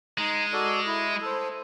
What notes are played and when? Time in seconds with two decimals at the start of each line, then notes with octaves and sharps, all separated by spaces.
0.18 G#3 D#4
0.53 F#4 A4 D5
0.86 E4
1.21 A4 C5